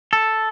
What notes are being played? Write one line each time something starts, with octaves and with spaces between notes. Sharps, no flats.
A4